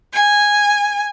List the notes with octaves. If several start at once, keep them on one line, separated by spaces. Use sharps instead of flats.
G#5